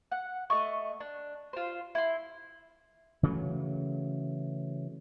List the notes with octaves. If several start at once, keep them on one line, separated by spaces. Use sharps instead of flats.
F#5
A3 D#5 C#6
D4
F4 C5
E4 C6
C#3 E3 F#3 A3